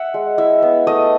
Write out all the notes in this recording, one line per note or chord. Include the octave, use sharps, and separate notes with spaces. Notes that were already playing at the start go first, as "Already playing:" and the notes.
Already playing: E5 F#5
G#3
E4 E5
B3
A3 D#5